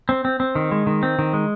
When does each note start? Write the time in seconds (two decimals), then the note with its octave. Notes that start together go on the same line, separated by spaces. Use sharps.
0.09 C4
0.25 C4
0.40 C4
0.55 D#3
0.71 G#3
0.87 D#3
1.03 C4
1.19 D#3
1.33 G#3